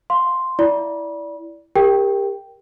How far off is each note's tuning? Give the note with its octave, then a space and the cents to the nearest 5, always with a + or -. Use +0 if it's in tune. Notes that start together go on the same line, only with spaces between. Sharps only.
F5 +20 C6 +0
E4 +0 D5 -15 B5 -35
G4 +30 A#4 +0 G5 +0